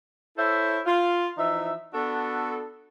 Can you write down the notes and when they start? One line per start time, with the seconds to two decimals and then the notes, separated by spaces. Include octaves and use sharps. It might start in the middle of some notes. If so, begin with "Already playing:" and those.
0.37 E4 A4 C5 C#5 E5
0.86 F4
1.37 E3 F3 D#4 E5
1.94 B3 D4 F#4 A4